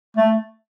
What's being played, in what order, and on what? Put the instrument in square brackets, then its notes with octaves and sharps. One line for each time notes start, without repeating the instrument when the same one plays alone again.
[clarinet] A3